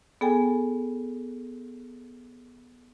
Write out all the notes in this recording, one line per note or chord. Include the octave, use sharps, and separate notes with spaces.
B3 G#4 A4 G5 G#5